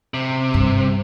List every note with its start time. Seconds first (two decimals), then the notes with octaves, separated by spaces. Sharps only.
0.14 C3
0.54 G2